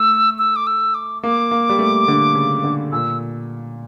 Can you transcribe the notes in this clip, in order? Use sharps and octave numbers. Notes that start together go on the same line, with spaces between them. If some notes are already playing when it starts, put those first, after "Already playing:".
Already playing: A3 E6
E6
D6
E6
D6
A#3 D6
A#3
G3
A3
D3
C#3
D3
A#2 E6